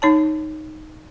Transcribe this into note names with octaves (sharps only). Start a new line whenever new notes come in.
D#4 C#5 A5